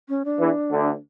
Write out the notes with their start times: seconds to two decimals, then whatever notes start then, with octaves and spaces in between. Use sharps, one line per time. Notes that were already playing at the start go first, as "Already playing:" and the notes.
0.09 C#4
0.25 D4
0.40 E2 E3
0.71 D2 D3